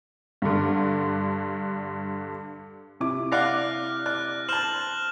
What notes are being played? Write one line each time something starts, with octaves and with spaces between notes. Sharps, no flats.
G2 D3
C3 E4 D6
D5 F5 F#5 F6 F#6 A#6
D5 F#6
C5 A5 F6 E7 F#7